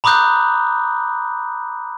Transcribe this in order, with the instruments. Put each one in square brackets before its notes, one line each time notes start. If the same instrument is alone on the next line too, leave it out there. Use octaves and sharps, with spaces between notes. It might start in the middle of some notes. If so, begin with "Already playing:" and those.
[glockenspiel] A#5 B5 D6 D#6 F#6 G6